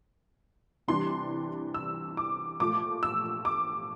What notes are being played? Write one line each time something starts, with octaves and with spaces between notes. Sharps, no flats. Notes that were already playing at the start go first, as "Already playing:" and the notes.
C3 E3 G3 D4 C6
E6
D6
A#2 F3 A3 D6
E6
D6